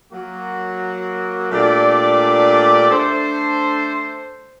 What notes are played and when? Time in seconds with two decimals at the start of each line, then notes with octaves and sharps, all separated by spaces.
0.11 F#3 A#3 F#4
1.51 A#2 A3 D4 G4 D5
2.91 A3 D4 A4 C5